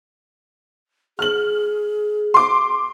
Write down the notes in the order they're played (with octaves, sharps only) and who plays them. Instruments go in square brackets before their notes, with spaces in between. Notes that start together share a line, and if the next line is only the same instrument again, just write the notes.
[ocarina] G#4 [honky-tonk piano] F6 F#7
[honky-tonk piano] C6 D6